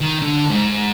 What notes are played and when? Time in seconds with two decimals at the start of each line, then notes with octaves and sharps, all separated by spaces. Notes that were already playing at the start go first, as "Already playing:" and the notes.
0.01 D#3
0.22 D3
0.49 G#2